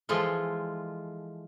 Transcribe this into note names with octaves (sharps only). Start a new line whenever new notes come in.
E3 F3 G#3 F4 A4